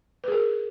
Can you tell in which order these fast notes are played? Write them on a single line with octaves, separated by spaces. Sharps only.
B4 G#4 A#4